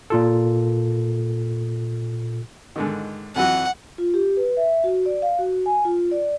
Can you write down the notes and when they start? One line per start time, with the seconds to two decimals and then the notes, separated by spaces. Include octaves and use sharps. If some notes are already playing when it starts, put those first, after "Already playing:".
0.10 A#2 F4 A4
2.76 G#2 D3 D#3
3.36 F2 E3 F#3 F#5
3.98 F4
4.14 G4
4.37 B4
4.57 E5
4.84 F#4
5.06 D5
5.22 F5
5.39 F#4
5.66 G#5
5.85 F4
6.11 D5